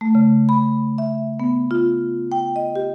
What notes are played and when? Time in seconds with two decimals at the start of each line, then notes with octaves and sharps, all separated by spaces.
0.01 A3
0.15 C#3
0.49 B5
0.98 E5
1.40 B3
1.71 F4
2.32 G5
2.56 D#5
2.75 G4